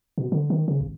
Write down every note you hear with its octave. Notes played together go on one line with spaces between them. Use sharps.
B2
D3
D#3
C#3
G#1